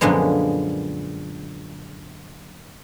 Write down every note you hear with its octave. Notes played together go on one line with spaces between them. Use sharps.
F#2 A#2 D3 F3 G#3 B3